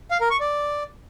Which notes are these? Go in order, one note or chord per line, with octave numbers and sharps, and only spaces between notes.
F5
A#4
C#6
D5